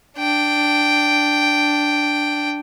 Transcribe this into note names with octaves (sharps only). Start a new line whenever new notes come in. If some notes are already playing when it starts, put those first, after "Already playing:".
D4 G5